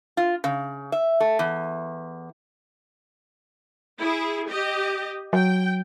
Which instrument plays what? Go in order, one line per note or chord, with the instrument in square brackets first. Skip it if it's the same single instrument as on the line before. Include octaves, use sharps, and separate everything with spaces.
[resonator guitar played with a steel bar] F4
C#3
E5
A3
E2
[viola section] E4 G#4
G4 D#5
[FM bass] F#3 [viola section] G5